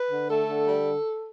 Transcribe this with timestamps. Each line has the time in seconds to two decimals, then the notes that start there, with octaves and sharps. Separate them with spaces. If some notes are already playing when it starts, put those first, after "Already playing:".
Already playing: B4
0.11 D3
0.29 A3 A4
0.48 D3
0.66 G3